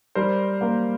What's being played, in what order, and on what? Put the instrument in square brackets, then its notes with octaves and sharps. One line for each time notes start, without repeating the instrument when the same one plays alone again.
[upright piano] G3 [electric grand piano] A#4 C5
[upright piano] A#3